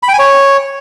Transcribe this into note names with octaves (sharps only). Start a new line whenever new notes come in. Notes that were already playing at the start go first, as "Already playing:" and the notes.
B5
G5
G#5
C#5